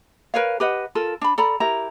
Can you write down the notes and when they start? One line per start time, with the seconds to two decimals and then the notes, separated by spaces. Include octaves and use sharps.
0.34 A#4 B4 C#5 F5
0.60 G4 B4 D#5 F#5
0.95 F4 A4 A#4
1.21 D4 B5
1.38 A4 D5 A#5 B5
1.60 E4 G4 A#4 A#5